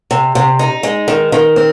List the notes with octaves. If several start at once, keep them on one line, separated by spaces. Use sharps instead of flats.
C3
C3
D#4
G#3
D#3
D#3
C4